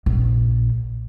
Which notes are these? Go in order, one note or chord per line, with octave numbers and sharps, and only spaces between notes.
A#1